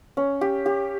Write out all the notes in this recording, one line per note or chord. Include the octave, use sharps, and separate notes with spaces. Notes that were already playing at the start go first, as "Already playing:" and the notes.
C#4
G4
G4